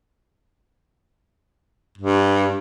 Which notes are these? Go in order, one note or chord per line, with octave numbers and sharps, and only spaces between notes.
G2